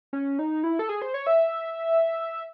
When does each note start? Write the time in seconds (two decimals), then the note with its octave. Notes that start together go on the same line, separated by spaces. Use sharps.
0.13 C#4
0.39 D#4
0.64 E4
0.79 A4
0.89 G#4
1.02 C5
1.14 C#5
1.27 E5